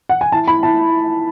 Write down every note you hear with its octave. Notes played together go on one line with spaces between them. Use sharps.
F#5
G#5
E4 A5
E4 B5
E4 A5